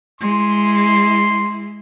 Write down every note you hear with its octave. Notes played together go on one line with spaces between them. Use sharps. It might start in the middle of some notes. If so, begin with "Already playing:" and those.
G#3 E4 C6